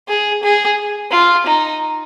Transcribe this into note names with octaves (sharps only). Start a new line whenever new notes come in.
G#4
G#4
F4
D#4